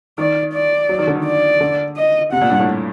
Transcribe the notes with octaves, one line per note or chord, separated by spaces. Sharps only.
D#3 D5
D5
F#3
D#3
D3
D#3
D5
D3
D#5
C3 F#5
A#2
G2
A2